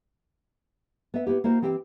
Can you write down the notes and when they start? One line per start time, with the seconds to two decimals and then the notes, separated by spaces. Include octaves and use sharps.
1.14 B3 E5
1.27 B3 E4 G4
1.44 A#3 E4 F#4 C5
1.62 E3 C4 G4 F#5 G5